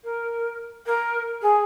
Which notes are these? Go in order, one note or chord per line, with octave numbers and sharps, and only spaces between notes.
A#4
A#4
G#4